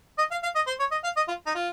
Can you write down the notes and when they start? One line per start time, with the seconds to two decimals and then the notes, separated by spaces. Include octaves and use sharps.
0.18 D#5
0.31 F5
0.43 F5
0.55 D#5
0.67 C5
0.80 C#5
0.92 D#5
1.04 F5
1.17 D#5
1.28 F4
1.46 D#4
1.55 F4